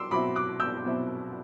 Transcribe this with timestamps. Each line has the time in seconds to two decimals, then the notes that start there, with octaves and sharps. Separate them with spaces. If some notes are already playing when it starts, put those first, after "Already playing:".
Already playing: F#3 C6 D6 E6
0.11 B2 F#3 C4 E4 B5 D6
0.35 D6 F#6
0.60 E6 G6
0.84 B2 F#3 C4 E4